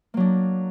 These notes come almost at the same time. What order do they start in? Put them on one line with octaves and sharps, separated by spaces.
A#3 F#3 D4